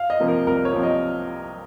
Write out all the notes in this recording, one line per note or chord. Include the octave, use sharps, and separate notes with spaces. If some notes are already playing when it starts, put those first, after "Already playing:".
Already playing: F5
D#5
C3 F3 A#3
A#4
C2 A#4
C#5
C3 F3 A#3
D#5